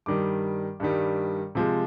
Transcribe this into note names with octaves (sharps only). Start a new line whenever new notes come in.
G2 D#3 G3 D6
G2 D#3 G3
C3 F3 G#3